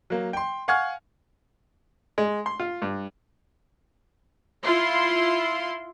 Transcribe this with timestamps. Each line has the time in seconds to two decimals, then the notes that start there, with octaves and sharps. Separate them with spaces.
0.10 F#3 A#3
0.33 G5 C6
0.68 F5 F#5 G#5 C#6 F6 G#6
2.18 G#3
2.46 C6
2.60 F4
2.82 G2
4.65 E4 F4 C6